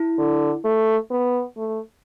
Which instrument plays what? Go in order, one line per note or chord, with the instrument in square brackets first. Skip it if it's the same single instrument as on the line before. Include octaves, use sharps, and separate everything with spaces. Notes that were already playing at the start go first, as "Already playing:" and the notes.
Already playing: [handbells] E4
[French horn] D3
A3
B3
A3